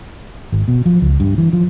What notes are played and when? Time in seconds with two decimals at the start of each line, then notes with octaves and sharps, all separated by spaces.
0.52 G#1
0.68 B2
0.86 F3
1.02 C#2
1.20 G2
1.38 E3
1.53 F3